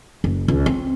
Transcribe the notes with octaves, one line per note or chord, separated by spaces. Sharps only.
F#1
C#2
C4